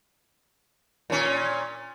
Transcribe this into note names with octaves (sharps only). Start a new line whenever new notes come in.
A#2 C#4